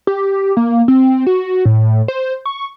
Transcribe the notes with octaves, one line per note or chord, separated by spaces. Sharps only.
G4
A#3
C4
F#4
A2
C5
C#6